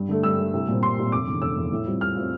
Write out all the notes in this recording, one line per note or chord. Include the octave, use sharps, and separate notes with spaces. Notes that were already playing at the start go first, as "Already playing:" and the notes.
Already playing: G2
D3 A3
G2 E6
D3 A3
C2
A#2 G3 C4
C2 C6
A#2 G3 C4
F1 D6
E2 D3
F1 E6
E2 D3
A2
G3 C4 F4
A2 F6
G3 C4 F4